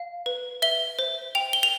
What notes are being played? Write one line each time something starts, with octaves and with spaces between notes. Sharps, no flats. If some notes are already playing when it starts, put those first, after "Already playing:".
Already playing: F5
B4
E5 G7
C5
G5 F7
G7
F7